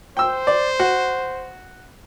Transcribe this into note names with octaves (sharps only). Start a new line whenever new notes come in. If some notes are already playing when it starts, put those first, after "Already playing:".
C5 G5 E6
D5
F#4